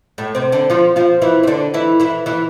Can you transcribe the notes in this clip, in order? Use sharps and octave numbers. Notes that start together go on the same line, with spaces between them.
A2 A3
C3 C4
D3 D4
F3 F4
F3 F4
E3 E4
C4
D3 D4
E3 E4
E3 E4
E3 E4